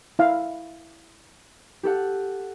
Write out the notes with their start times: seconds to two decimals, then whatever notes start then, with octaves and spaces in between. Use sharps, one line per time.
0.19 E4 F5
1.83 G4 A4 F#5